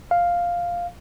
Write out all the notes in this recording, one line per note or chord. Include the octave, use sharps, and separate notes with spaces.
F5